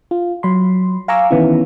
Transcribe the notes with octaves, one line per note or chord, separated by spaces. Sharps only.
F4
F#3 B5 C6
F5 G#5 A#5 C#6 D6 E6
D#3 E3 B3 C#4 E4